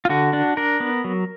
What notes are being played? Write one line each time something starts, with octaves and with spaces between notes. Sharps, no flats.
F4
D3 F#4
D4
D4 A#4
B3
F#3